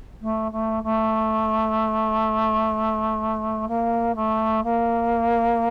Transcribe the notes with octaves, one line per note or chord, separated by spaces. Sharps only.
A3
A3
A3
A#3
A3
A#3